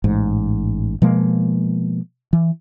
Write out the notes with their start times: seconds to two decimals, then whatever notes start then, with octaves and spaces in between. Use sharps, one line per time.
0.04 A1 G#2
1.02 B2 F3 G#3 A#3
2.33 E3